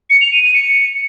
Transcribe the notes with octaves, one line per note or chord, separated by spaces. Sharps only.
C#7
F7
D#7
D#7
C#7